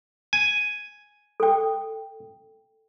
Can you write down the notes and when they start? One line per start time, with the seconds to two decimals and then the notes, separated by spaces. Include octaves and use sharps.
0.33 G#5
1.40 A4 G5